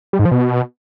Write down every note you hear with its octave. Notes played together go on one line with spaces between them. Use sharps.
G3
G#2
F3
B2